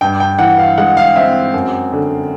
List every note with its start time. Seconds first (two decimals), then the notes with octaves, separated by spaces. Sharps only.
0.01 G2 G5
0.20 G5
0.39 E3 F#5
0.59 F5
0.78 G#3 F#5
0.97 F5
1.16 C4 E5
1.54 F#2
1.92 D3